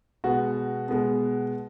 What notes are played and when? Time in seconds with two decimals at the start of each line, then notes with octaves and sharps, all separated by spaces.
0.24 B2 G#3 B3 F#4
0.89 B2 G#3 B3